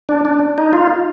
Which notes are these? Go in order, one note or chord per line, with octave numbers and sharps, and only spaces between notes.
D4
D4
D#4
F4